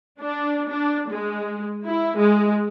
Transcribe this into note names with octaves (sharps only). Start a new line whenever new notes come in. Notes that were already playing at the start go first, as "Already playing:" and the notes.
D4
D4
G#3
E4
G#3